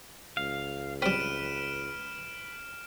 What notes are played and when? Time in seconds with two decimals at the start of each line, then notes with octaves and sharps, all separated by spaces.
0.37 C#2 F5
1.02 G3 C4 B4 F6 D7 E7